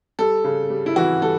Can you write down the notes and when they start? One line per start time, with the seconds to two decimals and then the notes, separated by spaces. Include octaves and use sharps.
0.19 G3 A4
0.44 C#3
0.70 G3
0.86 E4
0.96 E3 F#4
1.22 G3 A4